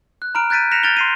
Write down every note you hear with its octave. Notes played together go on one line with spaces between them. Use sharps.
F#6
A#5 B5 F6 D7
F#6 G6 A6 B6 D7 D#7
F#6 A#6 B6 C#7 E7 F7
F6 G6 A6 D7 F7 G7
C6 C7 D#7